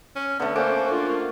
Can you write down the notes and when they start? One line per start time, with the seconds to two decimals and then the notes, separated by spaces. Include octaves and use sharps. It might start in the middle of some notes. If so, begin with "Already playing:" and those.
0.16 C#4
0.40 D3 A3 B3
0.56 A#3 C#4 A4 C5 F#5 D6
0.92 D4 F4